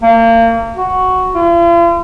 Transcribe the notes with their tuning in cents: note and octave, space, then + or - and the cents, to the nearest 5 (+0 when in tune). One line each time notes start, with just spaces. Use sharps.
A#3 -30
F#4 +0
F4 -45